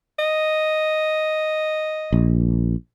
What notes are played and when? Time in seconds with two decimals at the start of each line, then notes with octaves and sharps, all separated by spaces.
0.19 D#5
2.13 A#1